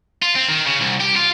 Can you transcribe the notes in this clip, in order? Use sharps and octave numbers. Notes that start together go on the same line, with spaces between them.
F4
C4
D#3
C#3
C2
G4
F4